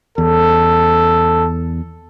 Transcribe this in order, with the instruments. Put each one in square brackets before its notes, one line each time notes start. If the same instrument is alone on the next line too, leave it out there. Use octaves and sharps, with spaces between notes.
[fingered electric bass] E2 [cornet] A4